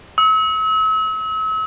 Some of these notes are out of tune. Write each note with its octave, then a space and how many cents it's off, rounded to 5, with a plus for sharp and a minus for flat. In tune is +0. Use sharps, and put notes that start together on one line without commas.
E6 -40